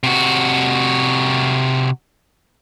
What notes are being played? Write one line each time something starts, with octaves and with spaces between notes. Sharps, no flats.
C3 F#4